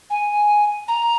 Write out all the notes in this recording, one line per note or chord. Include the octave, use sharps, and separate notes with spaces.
G#5
A#5